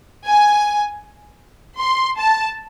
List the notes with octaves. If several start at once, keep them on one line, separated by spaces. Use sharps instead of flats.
G#5
C6
A5